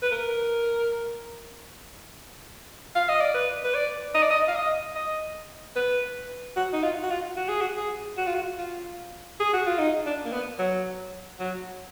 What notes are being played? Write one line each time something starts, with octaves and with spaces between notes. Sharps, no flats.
B4
A#4
F5
D#5
D5
B4
B4
D5
D#5
D5
D#5
F5
D#5
D#5
B4
F#4
D#4
F4
F#4
F4
F#4
G#4
F#4
G#4
F#4
F4
F#4
F4
G#4
F#4
F4
D#4
D4
A#3
B3
F#3
F#3